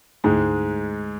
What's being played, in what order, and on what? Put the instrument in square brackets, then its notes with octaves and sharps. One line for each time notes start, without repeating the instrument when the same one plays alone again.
[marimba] D2 D3 A3 E4 G#4 [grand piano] G#2 G#3